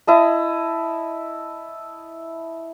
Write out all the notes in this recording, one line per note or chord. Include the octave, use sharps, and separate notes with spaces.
E4 D#5 A5